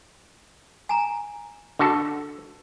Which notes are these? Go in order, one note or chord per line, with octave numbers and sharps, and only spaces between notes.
G#5 A#5
D3 F#4 A4